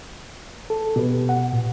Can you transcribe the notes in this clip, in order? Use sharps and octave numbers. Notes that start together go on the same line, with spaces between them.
A4
B2 G4 B4
F#5
A#2